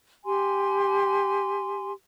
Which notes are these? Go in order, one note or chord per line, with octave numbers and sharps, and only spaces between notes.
G4 G#5 C6